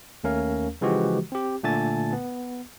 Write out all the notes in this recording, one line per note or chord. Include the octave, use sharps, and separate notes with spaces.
D#2 A3 C#4 A#4 F5
C#3 E3 F3 G#3 F#4 G4
C4 G4
A#2 D3 A3 G#5 A5 A6
B3